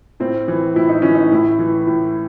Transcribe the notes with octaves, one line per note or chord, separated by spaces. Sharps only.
A2 C4
E3
A2 E4
D#4
E3 C#4
D#4
A2 E4
E3
A2